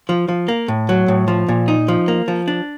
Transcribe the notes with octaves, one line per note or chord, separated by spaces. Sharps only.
F3
F3
A#3
A2
F#3
A2
F3
A#2
D#4
F3
A#3
F3
D4